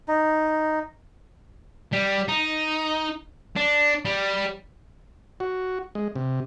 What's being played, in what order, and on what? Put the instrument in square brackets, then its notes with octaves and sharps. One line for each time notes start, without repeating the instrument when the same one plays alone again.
[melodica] D#4
[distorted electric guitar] G3
D#4
D4
G3
[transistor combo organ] F#4
G#3
C3